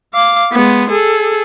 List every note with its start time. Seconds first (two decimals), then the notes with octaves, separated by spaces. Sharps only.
0.14 F5 D6
0.53 G#3 B3
0.90 G#4 A4